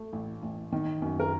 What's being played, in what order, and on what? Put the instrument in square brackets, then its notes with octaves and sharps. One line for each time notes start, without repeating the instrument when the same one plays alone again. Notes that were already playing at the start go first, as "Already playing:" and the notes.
Already playing: [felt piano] A3
A1
A1
D#3
F#2
[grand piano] A#4